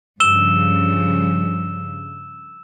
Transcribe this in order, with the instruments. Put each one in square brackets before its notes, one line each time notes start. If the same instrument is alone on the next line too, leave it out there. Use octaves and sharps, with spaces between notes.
[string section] G2 C#3 F3 [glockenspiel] E6 E7 G7